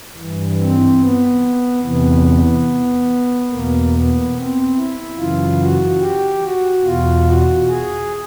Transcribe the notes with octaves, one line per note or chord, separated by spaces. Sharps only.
G2 E3
C4
B3
E2 C3 E3 B3
E2 B2 A#3
B3
C4
E4
F#2 C#3 E3 F4
F#4
G4
F#4
E2 B2 F4
F#4
G#4